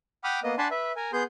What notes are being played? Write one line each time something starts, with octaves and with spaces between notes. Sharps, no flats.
F#5 G5 B5 D6 D#6 F6
A#3 B3 D#5
D4 F#5 G#5 A5 B5 C6
B4 E5
A#4 G#5
B3 G#4 C6 G6